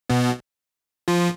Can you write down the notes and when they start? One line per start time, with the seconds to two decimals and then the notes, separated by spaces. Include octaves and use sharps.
0.10 B2 B3
1.08 F3 F4